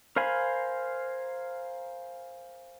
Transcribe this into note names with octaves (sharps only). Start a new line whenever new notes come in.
A#4 C5 F5 G#5 B5